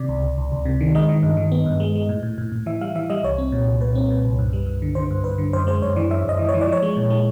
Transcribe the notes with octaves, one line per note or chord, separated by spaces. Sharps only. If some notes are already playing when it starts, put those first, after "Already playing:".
Already playing: C3 D5
C#2
C#2
C#2
C#2
C3
D#3
G#3 D#5
D#3
G2
D#3
B3
G2
G#3
G#3
A2
A2
A2
A2
E3 E5
G3 F5
E3 E5
G3 D#5
C2 C#5
C4
A#2
C2
A#2 B4
C4
A#2
C2
G2
G3
G2
D3
D3 C5
G2
G2 B4
D3
F#2 C5
G#3 C5
F#2 C#5
E3 D5
F#2 E5
F#2 D#5
E3
C#5
E3
D5
F3
C#5
G#3
A#2
G#3